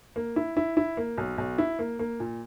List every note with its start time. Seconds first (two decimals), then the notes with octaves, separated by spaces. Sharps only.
0.16 A#3
0.36 E4
0.57 E4
0.77 E4
0.97 A#3
1.18 B1
1.38 B1
1.58 E4
1.79 A#3
1.99 A#3
2.20 A#2